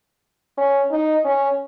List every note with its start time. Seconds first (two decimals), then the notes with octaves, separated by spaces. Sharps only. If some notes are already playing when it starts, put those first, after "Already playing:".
0.58 C#4
0.91 D#4
1.25 C#4